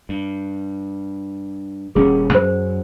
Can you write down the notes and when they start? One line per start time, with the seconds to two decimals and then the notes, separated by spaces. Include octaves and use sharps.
0.09 G2
1.95 D#1 G3 C#4 G#4
2.35 F#2 C5